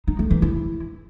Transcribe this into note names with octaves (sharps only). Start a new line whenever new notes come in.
D#4
A3
E3
E4